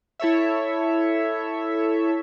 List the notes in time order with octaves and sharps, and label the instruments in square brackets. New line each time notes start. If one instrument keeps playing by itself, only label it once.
[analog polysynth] E4 A4 C#5 E5